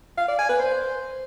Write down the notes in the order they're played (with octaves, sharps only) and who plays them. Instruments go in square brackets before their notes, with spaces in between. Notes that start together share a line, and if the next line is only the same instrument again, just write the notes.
[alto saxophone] F5
D5
G#5
B4
C5